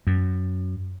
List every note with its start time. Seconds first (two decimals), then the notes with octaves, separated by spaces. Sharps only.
0.07 F#2